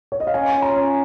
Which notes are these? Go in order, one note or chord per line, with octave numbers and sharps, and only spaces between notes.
C#5
D#5
F5
C#4 G#5
F4
A#5
C#4